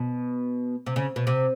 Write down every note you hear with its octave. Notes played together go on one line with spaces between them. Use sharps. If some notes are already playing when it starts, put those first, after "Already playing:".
Already playing: B2
C3
C#3
B2
C3